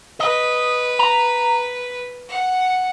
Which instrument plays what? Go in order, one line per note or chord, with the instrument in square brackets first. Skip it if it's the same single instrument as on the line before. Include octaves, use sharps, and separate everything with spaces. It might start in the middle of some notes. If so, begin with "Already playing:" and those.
[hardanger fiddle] B4 [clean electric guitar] D#5
[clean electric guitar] A#5
[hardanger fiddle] F#5